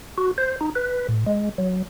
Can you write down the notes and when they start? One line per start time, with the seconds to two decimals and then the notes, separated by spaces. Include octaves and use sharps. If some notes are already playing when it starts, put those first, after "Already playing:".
0.18 F#4
0.38 C5
0.61 D#4
0.75 B4
1.09 A2
1.27 G#3
1.58 F#3